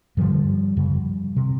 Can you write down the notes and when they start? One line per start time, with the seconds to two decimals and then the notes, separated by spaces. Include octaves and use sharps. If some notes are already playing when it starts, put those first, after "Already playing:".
0.17 G2 D3 F3 G3
0.77 F#2 C#3
1.36 C3